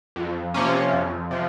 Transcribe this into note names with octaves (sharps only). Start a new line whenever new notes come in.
F2
C3 F3 A#3 C#4
F2
C3 F3